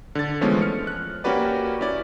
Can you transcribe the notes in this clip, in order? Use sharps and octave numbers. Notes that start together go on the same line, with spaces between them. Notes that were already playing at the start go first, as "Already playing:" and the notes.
D3 A6
E3 F3 G#3 A3 B3 C#4
F6 C#7
F#6
A#3 C#4 F#4 G4 B4 D5
C#4 E4 D5